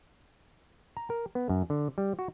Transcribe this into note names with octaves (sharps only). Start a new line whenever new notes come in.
A#5
A#4
B3
F#2
D3
G3
F#4